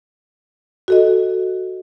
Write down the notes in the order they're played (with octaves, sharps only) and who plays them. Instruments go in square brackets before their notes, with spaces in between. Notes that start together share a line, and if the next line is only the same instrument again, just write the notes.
[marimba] F#4 A4 D#5